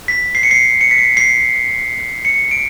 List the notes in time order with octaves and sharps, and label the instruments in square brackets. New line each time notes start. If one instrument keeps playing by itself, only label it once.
[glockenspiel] B6
C7
C#7
C7
C#7
B6
C7
C7
C#7
D7